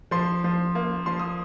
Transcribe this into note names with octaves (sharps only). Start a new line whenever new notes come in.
F3 C6
F3
A#3
F3 C6
D#6